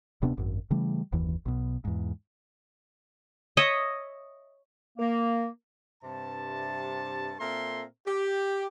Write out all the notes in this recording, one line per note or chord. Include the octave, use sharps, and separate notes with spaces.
D1 C3 B3 D4
G#1 F#2
C#3 E3 G3 A3
F#1 D#2 E3
B1 B2
E2 G#2
C#5 D#5 E5
A#3
G2 C3 A5
A#2 C4 A4 A#4 E5 C6
G4